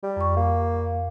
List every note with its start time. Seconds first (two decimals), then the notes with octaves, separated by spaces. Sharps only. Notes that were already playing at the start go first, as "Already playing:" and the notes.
0.03 G3
0.16 F2 C#6
0.37 A#3